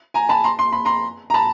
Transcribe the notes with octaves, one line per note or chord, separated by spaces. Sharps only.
G#5 A#5
A5 B5
A#5 C6
C6
B5
A#5 C6
A#5
A5 B5